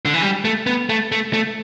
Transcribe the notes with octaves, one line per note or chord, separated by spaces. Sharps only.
D3
E3
G3
A3
B3
A3
A3
A3